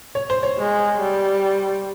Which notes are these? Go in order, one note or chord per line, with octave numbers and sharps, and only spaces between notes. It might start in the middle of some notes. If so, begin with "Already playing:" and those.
C#5
C5
C#5
G#3
G3